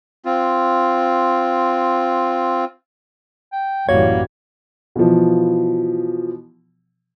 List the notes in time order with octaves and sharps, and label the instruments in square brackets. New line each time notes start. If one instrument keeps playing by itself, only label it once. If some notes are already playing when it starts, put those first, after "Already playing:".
[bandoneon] C4 F4
[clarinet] G5
[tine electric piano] A1 F#4 G#6 [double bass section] F#2 E3 G3 [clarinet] A#3 [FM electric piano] C#5
[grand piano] B2 E3 F3